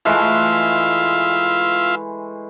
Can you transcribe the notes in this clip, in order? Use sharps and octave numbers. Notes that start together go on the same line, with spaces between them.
E3 G#3 A3 F4 E5 F5